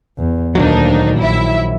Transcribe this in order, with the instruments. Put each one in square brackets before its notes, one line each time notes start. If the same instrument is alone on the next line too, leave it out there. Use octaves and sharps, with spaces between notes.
[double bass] E2
[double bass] D2 [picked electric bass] A#2 D#3 F#3 [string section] A#3 D4 D#4
[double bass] A#1 [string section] E4 E5